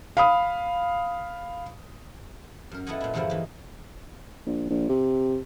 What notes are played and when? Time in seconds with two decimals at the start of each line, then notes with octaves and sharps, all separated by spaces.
0.17 F5 B5 D#6
2.71 F#2 A#4
2.87 B3 E4 A4 D#5 F#5 G#5
3.00 A#2 E4
3.14 E2 G2 D3 F3 A#3 E4
3.30 E3 D#4
4.46 A#1
4.70 A#1
4.89 C3